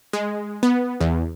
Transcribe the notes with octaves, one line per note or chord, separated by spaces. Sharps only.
G#3
B3
E2